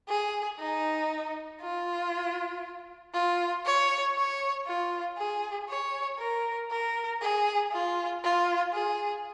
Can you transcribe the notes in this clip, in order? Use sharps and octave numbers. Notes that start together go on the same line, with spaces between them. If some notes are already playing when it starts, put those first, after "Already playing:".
G#4
D#4
F4
F4
C#5
C#5
F4
G#4
C#5
A#4
A#4
G#4
F4
F4
G#4